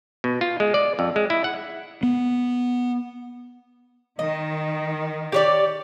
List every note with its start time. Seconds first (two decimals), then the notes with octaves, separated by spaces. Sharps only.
0.24 B2
0.41 F4
0.60 G#3
0.74 D5
0.99 F2
1.16 G#3
1.30 E4
1.44 F#5
2.03 B3
4.19 D#3 D#5
5.32 G4 C#5 D5